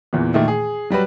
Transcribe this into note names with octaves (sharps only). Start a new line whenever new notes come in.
E2 A#2 E3
A#2 D#3 E3 A3
G#4
F#3 G3 F#4 B4